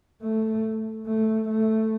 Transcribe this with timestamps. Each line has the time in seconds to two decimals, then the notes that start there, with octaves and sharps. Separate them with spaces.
0.22 A3
1.06 A3
1.49 A3